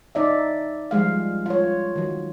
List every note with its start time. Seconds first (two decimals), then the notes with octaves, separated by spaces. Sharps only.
0.15 D#4 D5 E5
0.91 F3 G3 G#3 F5
1.46 F4 C#5
1.96 D#3 F#3